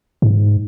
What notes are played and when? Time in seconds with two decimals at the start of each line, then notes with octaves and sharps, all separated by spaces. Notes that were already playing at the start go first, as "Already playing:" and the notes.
0.22 G#2